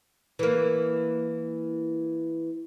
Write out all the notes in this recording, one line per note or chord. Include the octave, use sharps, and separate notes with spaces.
E3 A#3